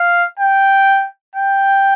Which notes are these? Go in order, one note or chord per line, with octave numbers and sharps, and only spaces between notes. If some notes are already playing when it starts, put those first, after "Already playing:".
Already playing: F5
G5
G5